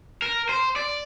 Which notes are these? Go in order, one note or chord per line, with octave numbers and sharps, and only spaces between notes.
A#4
C5
D5